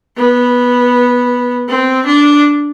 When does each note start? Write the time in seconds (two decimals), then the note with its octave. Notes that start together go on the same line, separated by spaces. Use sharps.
0.18 B3
1.69 C4
2.06 D4